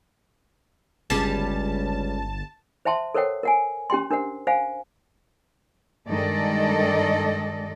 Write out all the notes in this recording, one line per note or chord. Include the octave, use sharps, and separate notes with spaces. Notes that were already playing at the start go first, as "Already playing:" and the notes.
G1 C#2 G3 C#4 G#4 A5
C5 E5 G5 A5 C6
A4 A#4 C5 C#5 F#5 G5
A#4 F#5 G#5
C#4 G4 G5 C6
D4 A#4 C5 F#5
C5 F5 F#5 G#5
G2 D#3 G#3 A4 D5 D#5